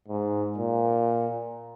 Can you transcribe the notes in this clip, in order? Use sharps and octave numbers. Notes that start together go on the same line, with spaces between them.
G#2
A#2